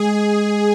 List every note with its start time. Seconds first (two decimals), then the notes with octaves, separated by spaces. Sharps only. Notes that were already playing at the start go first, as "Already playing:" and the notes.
Already playing: G#3 G#4